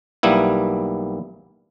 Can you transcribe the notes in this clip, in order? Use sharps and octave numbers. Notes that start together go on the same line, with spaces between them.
B1 G3 A#3 B3 E4